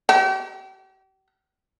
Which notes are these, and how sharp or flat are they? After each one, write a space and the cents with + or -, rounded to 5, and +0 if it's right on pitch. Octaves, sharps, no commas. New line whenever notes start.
G4 -40